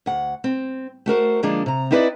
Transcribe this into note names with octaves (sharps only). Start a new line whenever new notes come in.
D2 F#5
C4
A3 F#4 A#4 C5
D3 F3 G#3 A#3 D4
C3 A#5
C4 D#4 E4 B4 C5 D5